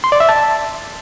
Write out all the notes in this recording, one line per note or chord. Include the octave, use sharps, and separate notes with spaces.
C6
D5
E5
A5